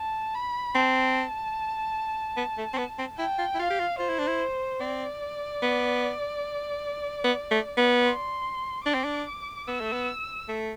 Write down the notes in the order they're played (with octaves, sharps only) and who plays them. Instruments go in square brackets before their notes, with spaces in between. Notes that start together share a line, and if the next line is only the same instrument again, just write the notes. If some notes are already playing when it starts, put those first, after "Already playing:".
Already playing: [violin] A5
B5
[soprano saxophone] C4 [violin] A5
[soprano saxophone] B3
A3
C4
B3
C4
[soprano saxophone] E4 [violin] G5
[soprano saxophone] F4
E4
[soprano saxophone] F4 [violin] F5
[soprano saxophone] G4
F4
[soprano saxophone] F4 [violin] C5
[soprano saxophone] E4
D4
E4
[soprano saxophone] C4 [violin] D5
[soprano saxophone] B3
B3
A3
B3
[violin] C6
[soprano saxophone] D4 [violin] D6
[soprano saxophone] C4
D4
[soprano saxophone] B3 [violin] E6
[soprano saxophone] A3
B3
A3